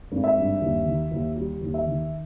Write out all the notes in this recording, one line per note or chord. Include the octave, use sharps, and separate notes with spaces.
G#1
E5
G2
D#2
D#3
D#2
G3
D#2
E5
D#3